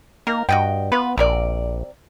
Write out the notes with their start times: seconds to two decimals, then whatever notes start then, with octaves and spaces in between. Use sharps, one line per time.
0.27 D#3 A#3 A#4
0.49 G2 F#4 D#5 G5
0.92 B3 F4 B4
1.17 A#1 C3 A#4 D5